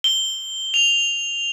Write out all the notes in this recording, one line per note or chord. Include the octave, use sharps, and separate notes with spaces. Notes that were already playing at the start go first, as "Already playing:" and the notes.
G7
F7